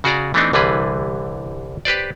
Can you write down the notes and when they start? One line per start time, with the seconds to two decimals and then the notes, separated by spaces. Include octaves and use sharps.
0.04 C#3 F#4 G#4 D5 A#5
0.34 E3 A3 B3 C4 D4 D#4
0.53 C2 D3 E3 G3 G#4 B4
1.85 G4 B4 C5 D5